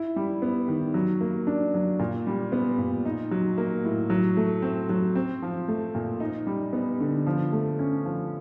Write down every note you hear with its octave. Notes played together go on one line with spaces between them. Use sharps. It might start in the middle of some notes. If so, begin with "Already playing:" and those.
Already playing: E4
G3
B3
D#3
F#3
A#3
D4
F#3
A#2
G3
B3
A#2
D#4
F#3
A#3
A2
F#3
A3
C4
F#3
C4
F3
A3
A#2
D#4
G3
B3
D3
F3
A3
C#4
F3